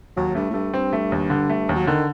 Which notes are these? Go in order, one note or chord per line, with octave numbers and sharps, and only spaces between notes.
D#2 F#3
G2 A3
A2
G2 A3
G2 C4
A3
D#2
D3
A3
D#2
F#3
D3 D#3